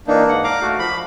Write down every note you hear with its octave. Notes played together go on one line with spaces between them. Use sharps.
E3 A#3 D4 D#4
G#2 F#5
F5 A#5 D6
A3 F#4
F3 B5